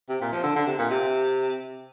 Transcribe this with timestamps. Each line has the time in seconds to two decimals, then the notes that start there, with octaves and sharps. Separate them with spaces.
0.09 C3
0.21 A#2
0.32 F3
0.43 D3
0.56 D3
0.67 C3
0.79 A#2
0.90 C3